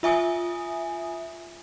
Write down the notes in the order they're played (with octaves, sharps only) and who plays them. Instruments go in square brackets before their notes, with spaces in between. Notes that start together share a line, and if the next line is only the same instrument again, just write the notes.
[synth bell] F4 E5 G#5 D#6